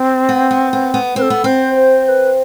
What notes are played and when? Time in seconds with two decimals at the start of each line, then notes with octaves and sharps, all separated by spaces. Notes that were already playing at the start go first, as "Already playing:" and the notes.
Already playing: C4
0.29 B3
0.51 B3
0.73 B3
0.94 B3
1.16 C4 B4
1.22 A4
1.30 B3
1.44 C4 C5
1.74 C5
2.04 C5
2.08 B4